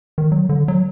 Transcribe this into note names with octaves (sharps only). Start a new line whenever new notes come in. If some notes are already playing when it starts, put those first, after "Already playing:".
D#3
F#3
D3
F#3